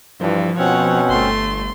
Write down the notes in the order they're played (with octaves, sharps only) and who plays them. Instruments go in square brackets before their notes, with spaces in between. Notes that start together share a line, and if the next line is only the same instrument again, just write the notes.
[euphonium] G2 [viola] E3 [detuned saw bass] F3
[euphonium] B2 [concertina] C4 C#4 [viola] C#5 F#5
[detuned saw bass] G1 [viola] A3 C6